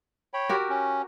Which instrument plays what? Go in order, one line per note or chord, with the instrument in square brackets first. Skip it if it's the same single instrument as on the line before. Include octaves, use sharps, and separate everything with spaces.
[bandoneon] C#5 G5 B5
[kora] F#4 G4 A#4
[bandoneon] C#4